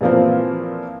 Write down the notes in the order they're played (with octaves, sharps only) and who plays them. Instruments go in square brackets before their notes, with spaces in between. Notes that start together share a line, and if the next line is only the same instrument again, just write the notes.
[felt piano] A#2 E3 F3 A#3 C4